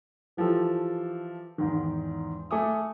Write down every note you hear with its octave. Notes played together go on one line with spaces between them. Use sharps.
E3 F3 G4 A4
E2 G#2 D#3
A3 G#5 D6 D#6